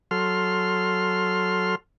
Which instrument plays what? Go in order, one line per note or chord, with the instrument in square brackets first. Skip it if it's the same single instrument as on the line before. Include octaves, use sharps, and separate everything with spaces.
[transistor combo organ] F#3 A4 C6 F6